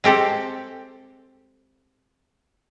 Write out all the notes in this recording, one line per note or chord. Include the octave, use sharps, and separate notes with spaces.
G#3 C4 G4 A4